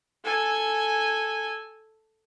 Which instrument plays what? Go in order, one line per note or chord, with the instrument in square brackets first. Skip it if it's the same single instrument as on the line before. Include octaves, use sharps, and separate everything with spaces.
[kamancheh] A4 G#5